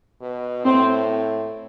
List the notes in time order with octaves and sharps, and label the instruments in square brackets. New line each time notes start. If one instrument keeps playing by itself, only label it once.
[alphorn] B2
[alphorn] A2 [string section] C4